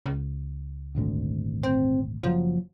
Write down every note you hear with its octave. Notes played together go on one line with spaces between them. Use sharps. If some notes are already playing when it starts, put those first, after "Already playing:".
C#2
D#1 G#1 D2
C4
F#1 C#3 F3 F#3